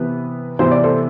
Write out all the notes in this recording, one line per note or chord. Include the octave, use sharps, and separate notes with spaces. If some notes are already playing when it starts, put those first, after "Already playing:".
Already playing: C3 E3 B3 B4
C3 E3 B3 C5
D5
A4 C5